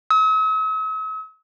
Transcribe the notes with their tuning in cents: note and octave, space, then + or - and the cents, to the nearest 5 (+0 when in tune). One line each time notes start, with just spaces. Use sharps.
E6 -45